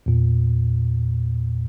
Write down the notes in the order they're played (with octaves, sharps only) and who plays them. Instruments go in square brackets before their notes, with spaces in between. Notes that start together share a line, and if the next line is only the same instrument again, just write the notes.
[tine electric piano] E2 A#2